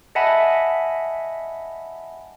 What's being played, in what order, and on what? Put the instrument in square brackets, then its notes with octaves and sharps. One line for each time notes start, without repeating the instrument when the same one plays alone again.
[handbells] D#5 E5 F#5 G#5 A5 B5